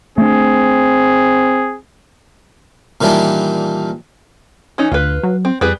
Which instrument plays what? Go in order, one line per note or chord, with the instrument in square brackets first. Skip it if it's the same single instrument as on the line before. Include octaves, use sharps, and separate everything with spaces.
[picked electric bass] A3 A#3 D4 [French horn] C4 [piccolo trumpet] G#4
[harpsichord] A#2 D#3 E3 G3 D4
[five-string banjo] E3 C#4 D#4
[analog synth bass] D2 [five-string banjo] F4 B4
[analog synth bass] F#3
[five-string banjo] C4
[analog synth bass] F2 [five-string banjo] G3 G#4 B4